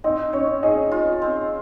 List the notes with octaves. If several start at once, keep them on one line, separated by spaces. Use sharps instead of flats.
C4 D#4
C#4 C#5
D#4 G#4
F4
C4